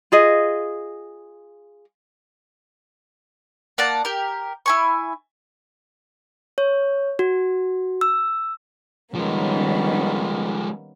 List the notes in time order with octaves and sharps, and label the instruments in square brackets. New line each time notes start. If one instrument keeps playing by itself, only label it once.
[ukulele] F4 G#4 D#5
[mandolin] A#3 D5 F#5 A5
G4 A#4
E4 G#5 C#6
[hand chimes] C#5
F#4
E6
[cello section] D#3 C#4 [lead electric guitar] F3 G#3 [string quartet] G3 A#3 B3